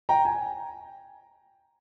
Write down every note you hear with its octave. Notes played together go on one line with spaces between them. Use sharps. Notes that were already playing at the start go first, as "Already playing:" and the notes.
G5 A#5
G#5